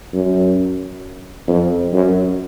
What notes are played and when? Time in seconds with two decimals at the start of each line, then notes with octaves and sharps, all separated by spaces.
0.13 F#2
1.48 F2
1.93 F#2